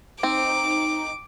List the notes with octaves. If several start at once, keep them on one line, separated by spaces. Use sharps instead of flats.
C4 D#4 D6